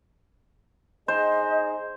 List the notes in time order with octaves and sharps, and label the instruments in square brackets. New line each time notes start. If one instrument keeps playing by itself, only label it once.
[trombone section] D#4 G#4 [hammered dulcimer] C5 [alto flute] D#5